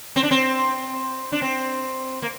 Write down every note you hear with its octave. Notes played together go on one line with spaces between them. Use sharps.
C4
D4
C4
D4
C4
A#3